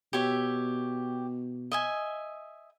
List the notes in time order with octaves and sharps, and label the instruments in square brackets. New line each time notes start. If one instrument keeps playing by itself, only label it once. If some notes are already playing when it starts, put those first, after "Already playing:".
[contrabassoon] B2 [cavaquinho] G4 C#5 E5
[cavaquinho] D#5 E5 G#5